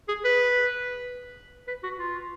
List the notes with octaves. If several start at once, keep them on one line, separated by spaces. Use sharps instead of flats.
G#4
B4
B4
F#4
F4